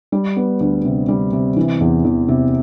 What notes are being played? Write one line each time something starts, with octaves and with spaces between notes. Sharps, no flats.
G3
B3
D2
C3
G3
C3
E3
E2
E2
C3